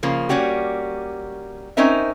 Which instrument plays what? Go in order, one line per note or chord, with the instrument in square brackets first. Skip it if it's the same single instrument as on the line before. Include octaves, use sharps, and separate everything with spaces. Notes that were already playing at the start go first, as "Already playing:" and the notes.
[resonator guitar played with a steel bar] C#3 F3 A#3
G3 A#3 C#4 F#4 G4
C4 C#4 D#4 A#4 C5 E5